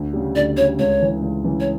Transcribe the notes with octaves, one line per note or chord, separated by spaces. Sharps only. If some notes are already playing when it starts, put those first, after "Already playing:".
Already playing: D2
C#3 G3
D2 D5
C#3 G3 C#5
C#2 C#5
C#3 E3
C#2
C#3 E3
C#5